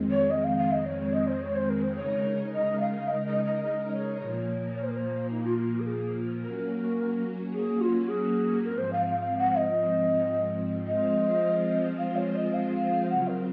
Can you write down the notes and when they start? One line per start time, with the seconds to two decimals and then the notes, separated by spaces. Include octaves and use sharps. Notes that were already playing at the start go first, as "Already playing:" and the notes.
Already playing: F2 D#3 G#3 C4
0.11 C#5
0.30 D#5
0.44 F5
0.58 F5
0.72 D#5
0.85 C#5
1.00 C#5
1.13 D#5
1.27 C5
1.41 C#5
1.56 C5
1.70 A#4
1.83 C5
1.96 C#3 G#3 D#4 A#4 C#5
2.53 D#5
2.81 F5
3.08 D#5
3.27 D#5
3.45 D#5
3.64 D#5
3.92 C#5
4.19 A#2 F3 A#3 C#5
4.75 C#5
4.83 C5
4.89 A#4
4.96 C5
5.31 D#4
5.44 F4
5.58 F4
5.72 F4
5.80 A#4
5.86 G#4
6.42 F#3 A#3 C#4 F#4 A#4
7.53 G#4
7.81 F4
8.08 G#4
8.65 G#2 F3 C4 A#4
8.78 C5
8.93 F5
9.06 F5
9.20 F5
9.38 F#5
9.58 D#5
10.86 F3 G#3 C4 F4 C5 D#5
11.98 F5
12.16 C#5
12.35 D#5
12.54 F5
13.10 C#3 F#3 C4 F4 F#5
13.28 A#4